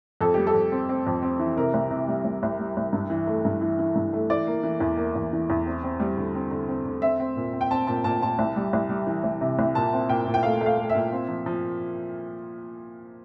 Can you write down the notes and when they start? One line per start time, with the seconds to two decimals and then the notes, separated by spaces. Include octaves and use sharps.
0.21 F2 A4
0.34 G3 G4
0.47 A4
0.54 F2
0.72 C4
0.89 C4
1.07 F2
1.23 C4
1.40 E3
1.57 C3 A#4
1.74 C2
1.91 C3
2.08 G3
2.25 C2
2.43 C2
2.59 G3
2.77 C2
2.93 G2
3.10 E3
3.27 A3
3.45 G2
3.61 E3
3.79 E3
3.96 G2
4.13 A3
4.30 E3 D5
4.47 A#3
4.63 E3
4.80 E2
4.97 A#3
5.15 E2
5.33 E3
5.50 E2
5.66 C4
5.83 C4
6.00 G3
6.17 D3
6.35 C4
6.51 D3
6.69 C4
6.85 D3
7.02 C4 E5
7.20 C4
7.36 A#2
7.53 C4
7.61 G5
7.70 C4 A5
7.87 A#2 A5
8.04 A#2 A5
8.22 A#2 A5
8.39 C2
8.56 G3
8.73 C2
8.89 G3
9.07 E3
9.24 C2
9.41 C3
9.59 C2
9.75 A#2 A5
9.93 C4
10.09 A#2 G5
10.27 A#2
10.34 G5
10.43 A3 F5
10.61 A3
10.66 F5
10.77 A3
10.90 E5
10.95 A#2
11.12 C4
11.29 F3
11.46 F3